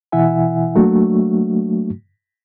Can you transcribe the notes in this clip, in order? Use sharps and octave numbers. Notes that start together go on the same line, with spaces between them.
B2 E3 E4 E5 F#5 G#5
F#3 A3 A#3 D4 F#4